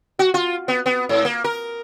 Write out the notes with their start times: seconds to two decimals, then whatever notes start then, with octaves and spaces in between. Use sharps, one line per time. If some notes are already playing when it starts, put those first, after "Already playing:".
0.19 F#4
0.34 F4
0.68 B3
0.86 B3
1.09 G#2
1.25 A#3
1.44 A#4